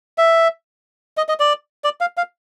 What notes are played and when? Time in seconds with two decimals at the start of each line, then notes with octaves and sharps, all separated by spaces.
0.18 E5
1.17 D#5
1.29 D#5
1.40 D5
1.84 D5
2.01 F5
2.17 F5